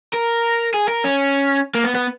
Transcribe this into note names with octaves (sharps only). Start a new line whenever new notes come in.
A#4
G#4
A#4
C#4
A#3
B3
B3